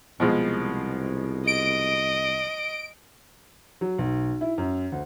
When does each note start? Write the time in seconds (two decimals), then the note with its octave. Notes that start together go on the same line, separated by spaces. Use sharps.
0.20 C2 B2 F3 G#3
1.47 D#5 D7
3.81 F#3
3.99 B1
4.41 E4
4.58 F#2
4.92 D2